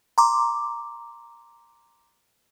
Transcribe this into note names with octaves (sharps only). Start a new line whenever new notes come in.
A#5 C6 D6